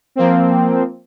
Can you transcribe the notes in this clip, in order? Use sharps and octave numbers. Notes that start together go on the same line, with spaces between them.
F3 A#3 C4